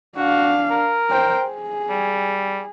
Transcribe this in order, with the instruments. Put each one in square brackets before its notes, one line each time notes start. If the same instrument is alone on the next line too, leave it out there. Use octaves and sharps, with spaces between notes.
[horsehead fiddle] D4 F5 [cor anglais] F#4
[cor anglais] A#4
[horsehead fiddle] C5 G5
G#4
[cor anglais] G3